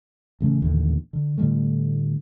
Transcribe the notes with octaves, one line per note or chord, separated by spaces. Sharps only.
A1 C#3 A3 C#4
A1 D#2 A#2 D3
D3
A2 D3 G3 A3